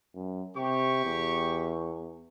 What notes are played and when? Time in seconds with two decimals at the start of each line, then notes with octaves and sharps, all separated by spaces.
0.15 F#2
0.56 C3 G4 C#6
1.05 E2